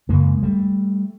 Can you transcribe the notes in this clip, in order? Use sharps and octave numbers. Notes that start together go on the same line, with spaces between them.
F#2 C#3 G#3 A#3
G3 A3